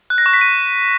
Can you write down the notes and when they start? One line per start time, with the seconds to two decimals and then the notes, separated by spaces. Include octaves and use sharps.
0.10 F#6
0.18 A#6
0.26 C#6
0.34 B6
0.41 D#7